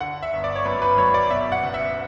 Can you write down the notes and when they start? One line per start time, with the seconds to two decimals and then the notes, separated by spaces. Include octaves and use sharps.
0.01 D3 F#5
0.22 E5
0.33 G1
0.44 D5
0.55 C#5
0.65 F#2 B4
0.82 B4
0.97 F#3 C#5
1.14 D5
1.30 B2 E5
1.52 F#5
1.63 F#1
1.74 E5